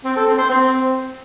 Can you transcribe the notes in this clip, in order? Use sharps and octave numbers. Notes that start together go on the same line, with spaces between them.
C4
A4
C4
C5
C4